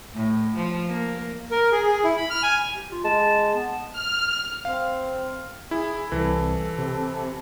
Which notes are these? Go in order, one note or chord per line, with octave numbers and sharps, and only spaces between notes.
A2
F3
A#3
A#4
G#4
G#4
E4
B5
F6
G#5
G4
F4
G#3 A5
B3
F6
C4 F5
E4 G#4
C2 E3 A4
C3